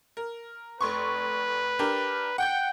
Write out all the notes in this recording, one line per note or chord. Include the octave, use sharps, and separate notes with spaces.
A#4
F1 B4 C6 C#6
D4 G4 A#4
F#5 G5 G6